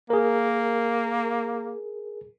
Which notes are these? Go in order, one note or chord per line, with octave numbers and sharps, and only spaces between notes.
A#3 G#4 A#4